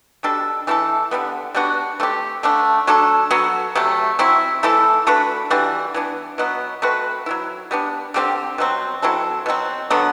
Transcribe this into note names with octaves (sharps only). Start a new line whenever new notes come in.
B2 G3 D4 A4
E3 A3 E4 A4
D3 G3 B3
G3 B3 D4 F#4
A3 C4 G4
D3 A3 D4
F#3 A3 D4 A4
F#3 B3 F#4 A4
C3 F#3 A3
F#3 C4 E4
E3 A3 E4 A4
A3 D4 F#4 B4
E3 G3 D4 F#4
E3 B3 D4
B2 F#3 B3
A3 C4 F#4 B4
F#3 B3 E4
G3 B3 D4
D3 G3 C4 G4
B2 F#3 C4
F#3 C4 E4 A4
B2 F#3 C4
D3 F#3 B3